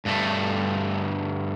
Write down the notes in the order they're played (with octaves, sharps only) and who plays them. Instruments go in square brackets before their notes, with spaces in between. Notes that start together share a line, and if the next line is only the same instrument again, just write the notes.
[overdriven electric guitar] G2 A3